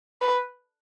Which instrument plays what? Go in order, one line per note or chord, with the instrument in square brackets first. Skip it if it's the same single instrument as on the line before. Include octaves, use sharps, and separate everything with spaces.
[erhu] B4